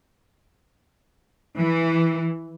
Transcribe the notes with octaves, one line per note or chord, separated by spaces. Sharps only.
E3